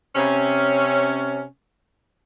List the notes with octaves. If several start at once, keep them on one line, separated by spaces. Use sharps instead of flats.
C3 C#4